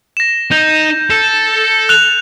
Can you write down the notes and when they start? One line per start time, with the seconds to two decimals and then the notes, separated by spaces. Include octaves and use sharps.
0.17 A#6 E7
0.52 D#4 G6
1.10 A4
1.89 F#6 F7